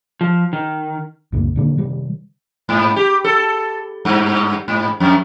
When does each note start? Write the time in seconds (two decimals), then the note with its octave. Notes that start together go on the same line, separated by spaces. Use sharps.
0.21 F3
0.53 D#3
1.32 C2 F#2 C#3 A#3
1.56 A#2 D3 D#3 A#3
1.78 C3 D#3 G3
2.69 G#2
2.96 G4
3.24 A4
4.05 G2
4.68 G#2
5.00 F2